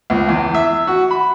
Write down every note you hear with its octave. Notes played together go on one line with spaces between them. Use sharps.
C#2
E2
E5
F#4
B5